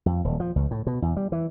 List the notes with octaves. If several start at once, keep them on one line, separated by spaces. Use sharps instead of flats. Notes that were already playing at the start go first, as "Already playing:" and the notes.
F2
D#1
F3
C#2
A2
B2
E2
G3
E3